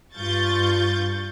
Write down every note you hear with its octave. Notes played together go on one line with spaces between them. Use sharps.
G2 F4 C#6 G6 A6